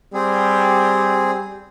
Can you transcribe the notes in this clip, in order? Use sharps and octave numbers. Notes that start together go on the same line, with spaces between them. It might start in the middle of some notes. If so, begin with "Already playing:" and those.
G3 C4 G#4